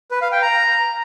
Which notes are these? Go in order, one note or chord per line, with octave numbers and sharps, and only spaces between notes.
B4
F5
G5
A#5